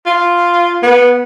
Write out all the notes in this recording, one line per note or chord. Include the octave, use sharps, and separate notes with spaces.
F4
B3